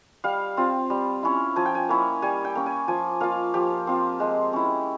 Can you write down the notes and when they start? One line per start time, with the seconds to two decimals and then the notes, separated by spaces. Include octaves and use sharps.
0.24 G3 F5
0.57 C4 F4
0.90 G3
1.23 C#4 E4
1.56 F3 G#5
1.66 G5
1.75 G#5
1.89 A#3 C#4 E4
2.22 G3 G#5
2.45 G5
2.55 A#3 C#4
2.66 G#5
2.88 F3 G#5
3.20 A#3 F4 F5
3.54 F3 G4
3.87 C4 F4
4.20 G#3
4.53 C#4 E4